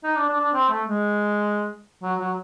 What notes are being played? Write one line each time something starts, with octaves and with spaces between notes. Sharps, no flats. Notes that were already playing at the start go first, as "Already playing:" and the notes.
D#4
D4
D4
D4
C4
A3
G#3
F#3
F#3